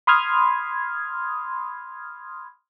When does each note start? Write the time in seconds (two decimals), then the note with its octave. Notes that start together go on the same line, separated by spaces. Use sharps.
0.07 B5 C6 D#6 F6 G#6